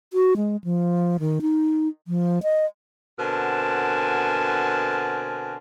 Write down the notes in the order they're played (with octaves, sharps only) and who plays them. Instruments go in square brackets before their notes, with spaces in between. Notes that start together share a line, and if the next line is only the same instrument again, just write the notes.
[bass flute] F#4
G#3
F3
D#3
D#4
F3
D#5
[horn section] B2 D3 C4 A#4 G#5 A5